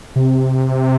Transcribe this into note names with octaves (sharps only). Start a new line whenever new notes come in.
C3